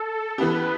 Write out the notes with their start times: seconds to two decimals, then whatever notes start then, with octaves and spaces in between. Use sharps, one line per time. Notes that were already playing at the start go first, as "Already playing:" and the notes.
Already playing: A4
0.38 E3 B3 E4 G4 B4